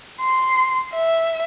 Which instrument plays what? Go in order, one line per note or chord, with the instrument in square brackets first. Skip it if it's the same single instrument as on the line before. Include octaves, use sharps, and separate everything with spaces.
[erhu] C6
E5